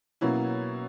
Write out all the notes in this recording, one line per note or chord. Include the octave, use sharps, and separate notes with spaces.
B2 F#3 A#3 C#4 E4